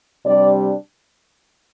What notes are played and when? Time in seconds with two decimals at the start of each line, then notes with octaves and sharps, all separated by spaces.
0.24 C3 G3 D4 D5